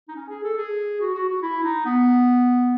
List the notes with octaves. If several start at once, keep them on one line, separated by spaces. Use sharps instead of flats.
D#4
C#4
G#4
A4
G#4
F#4
F#4
F#4
E4
D#4
B3